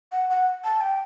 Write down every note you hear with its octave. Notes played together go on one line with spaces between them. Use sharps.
F#5
F#5
A5
G5